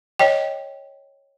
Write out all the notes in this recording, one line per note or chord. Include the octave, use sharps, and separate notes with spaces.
C#5 D#5 G5